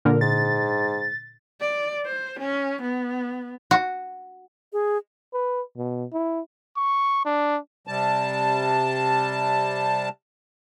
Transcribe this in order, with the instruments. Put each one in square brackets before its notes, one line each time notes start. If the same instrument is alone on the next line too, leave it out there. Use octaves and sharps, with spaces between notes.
[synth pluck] A#2 D3 [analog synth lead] A#4
[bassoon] G#2 [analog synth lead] A6
[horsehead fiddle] D5
C5
C#4
B3
[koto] F#4
[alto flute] G#4
[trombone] B4
B2
E4
[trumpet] C#6
D4
[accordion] C3 G3 A5